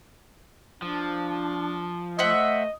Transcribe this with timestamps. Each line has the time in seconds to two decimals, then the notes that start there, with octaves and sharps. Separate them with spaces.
0.82 F3 D4
2.19 A3 C5 D#5 E5 F#5